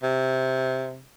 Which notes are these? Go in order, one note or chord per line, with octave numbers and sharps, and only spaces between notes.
C3